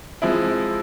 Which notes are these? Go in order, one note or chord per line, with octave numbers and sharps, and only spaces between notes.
F3 G#3 C4 E4